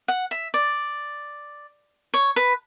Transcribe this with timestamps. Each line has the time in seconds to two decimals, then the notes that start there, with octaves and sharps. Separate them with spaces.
0.08 F#5
0.31 E5
0.54 D5
2.14 C#5
2.36 B4